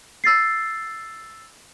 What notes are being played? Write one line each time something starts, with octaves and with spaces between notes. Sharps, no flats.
E6 A6 C7